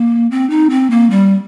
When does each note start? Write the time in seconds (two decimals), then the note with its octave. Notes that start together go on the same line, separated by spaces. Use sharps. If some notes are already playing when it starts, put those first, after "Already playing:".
Already playing: A#3
0.31 C4
0.50 D#4
0.70 C4
0.91 A#3
1.10 G3